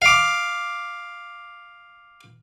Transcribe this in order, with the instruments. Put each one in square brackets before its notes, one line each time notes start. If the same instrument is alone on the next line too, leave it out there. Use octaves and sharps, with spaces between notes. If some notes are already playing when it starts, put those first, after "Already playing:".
[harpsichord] F5 D6